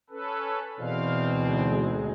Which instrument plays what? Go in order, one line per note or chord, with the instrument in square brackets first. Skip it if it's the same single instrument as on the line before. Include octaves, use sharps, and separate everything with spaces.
[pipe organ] C#4 A4 B4
[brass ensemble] E2 C4 [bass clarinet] B2 [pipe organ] F5
[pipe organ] D2 G#2 G#3